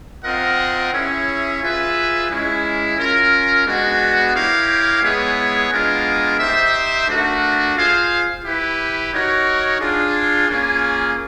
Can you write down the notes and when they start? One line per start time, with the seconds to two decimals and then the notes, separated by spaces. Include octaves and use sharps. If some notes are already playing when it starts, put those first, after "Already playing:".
0.24 C4 F4 A#4 D#5 F#5
0.92 C#4 E4 G#4 C#5 E5
1.61 F4 G#4 B4 E5
2.28 G#3 C#4 E4
2.97 C#4 F4 A#4
3.65 G#3 B3 D4 F#4
4.33 E4 G4 A#4 C#5 F5
5.02 G#3 B3 E4 G#4 C#5
5.69 G#3 B3 D4 F4 A#4
6.39 D#4 G4 C5 E5
7.07 A3 D4 F#4 A#4
7.75 F4 G#4 C5 F5
8.43 E4 G4 B4
9.12 D#4 F#4 A#4 C#5
9.80 D4 F4 G#4
10.48 A#3 C#4 F4 G#4